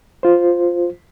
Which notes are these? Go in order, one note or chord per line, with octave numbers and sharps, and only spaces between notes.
F4 C5